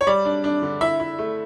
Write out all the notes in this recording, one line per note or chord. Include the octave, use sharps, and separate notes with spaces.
C#5
G3 D5
D4
D4
D3
E4 E5
E4
A3